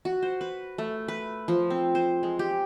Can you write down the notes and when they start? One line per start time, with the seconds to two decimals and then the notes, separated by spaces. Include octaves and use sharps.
0.05 F#4
0.23 C5
0.41 B4
0.78 A3
1.08 B4
1.48 F3
1.70 C4
1.95 C5
2.23 G#3
2.39 G4